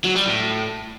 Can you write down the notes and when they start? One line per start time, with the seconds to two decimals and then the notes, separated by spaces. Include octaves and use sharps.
0.04 F#3
0.15 G3
0.26 A2